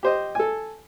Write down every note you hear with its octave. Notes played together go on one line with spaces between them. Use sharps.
G4 C5 D#5
A4 G#5